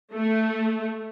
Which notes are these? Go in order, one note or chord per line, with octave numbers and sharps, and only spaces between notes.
A3